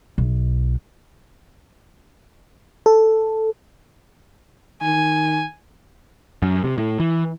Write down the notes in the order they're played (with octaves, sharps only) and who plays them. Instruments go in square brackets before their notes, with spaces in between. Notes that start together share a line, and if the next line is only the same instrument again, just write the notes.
[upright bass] B1
[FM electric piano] A4
[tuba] D#3 [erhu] G#5
[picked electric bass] F#2
C3
A2
E3